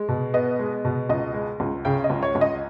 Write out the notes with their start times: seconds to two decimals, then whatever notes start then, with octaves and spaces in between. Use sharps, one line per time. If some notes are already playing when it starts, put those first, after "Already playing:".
Already playing: G#3
0.08 B2
0.34 B3 D#5
0.59 G#3
0.85 B2
1.09 C#2 D#5
1.34 G#3
1.60 C#2
1.85 C#3 G5
2.04 D#5
2.10 C#2
2.23 C#5
2.35 C#2
2.41 D#5